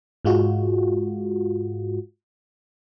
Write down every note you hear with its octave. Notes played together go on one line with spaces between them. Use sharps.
G#2 G#3 F4 F#4